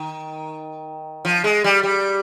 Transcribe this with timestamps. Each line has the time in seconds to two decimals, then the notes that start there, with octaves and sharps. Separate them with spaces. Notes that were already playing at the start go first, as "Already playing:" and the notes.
Already playing: D#3
1.25 F3
1.44 G#3
1.64 G3
1.83 G3